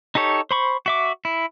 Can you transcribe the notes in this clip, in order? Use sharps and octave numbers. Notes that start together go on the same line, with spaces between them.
D#4 G4 A4 C#5
C5 B5 C#6
F#4 E5 D6
E4